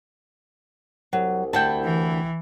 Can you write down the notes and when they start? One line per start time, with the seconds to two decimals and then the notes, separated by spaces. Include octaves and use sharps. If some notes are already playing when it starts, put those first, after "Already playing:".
1.13 C2 F#3
1.53 D2 E4 G5 A5
1.84 E3